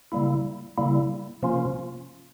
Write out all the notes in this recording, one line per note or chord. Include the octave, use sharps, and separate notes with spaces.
C#3 G3 A#3 E4
C#3 G3 A#3 E4
C3 F3 A#3 C#4 F4